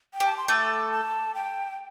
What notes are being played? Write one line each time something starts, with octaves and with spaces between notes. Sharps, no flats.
G5
G4
A5
C6
A3 A4 D6
A5
G5